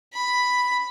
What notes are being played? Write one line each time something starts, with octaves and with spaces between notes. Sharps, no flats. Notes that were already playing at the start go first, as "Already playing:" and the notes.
B5